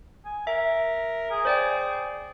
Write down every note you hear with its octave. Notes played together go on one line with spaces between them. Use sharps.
G#5
A#4 E5
G#4
C5 D5 G5